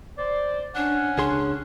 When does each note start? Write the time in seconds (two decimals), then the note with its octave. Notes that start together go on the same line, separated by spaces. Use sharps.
0.18 C5 D5
0.75 C#4 D4 F#5
1.18 C#2 D4 G#4 C6